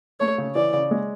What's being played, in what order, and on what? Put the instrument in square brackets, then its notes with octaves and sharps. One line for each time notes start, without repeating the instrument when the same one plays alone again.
[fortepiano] A3 [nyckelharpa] C#5
[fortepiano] C#3
[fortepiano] E3 [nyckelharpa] D5
[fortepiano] C#3
G#3